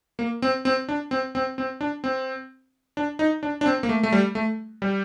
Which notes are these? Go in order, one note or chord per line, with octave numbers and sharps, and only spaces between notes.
A#3
C4
C4
D4
C4
C4
C4
D4
C4
D4
D#4
D4
D4
C4
A#3
A3
A3
G3
A3
G3